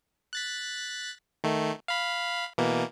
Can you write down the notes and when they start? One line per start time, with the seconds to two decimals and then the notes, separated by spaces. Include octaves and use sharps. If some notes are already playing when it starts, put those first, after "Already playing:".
0.33 F#6 A6 B6
1.44 D#3 A3
1.88 F5 B5
2.58 B2 E3 A#3